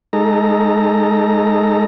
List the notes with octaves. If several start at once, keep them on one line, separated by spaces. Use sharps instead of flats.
G#3 D#4 A4 A#5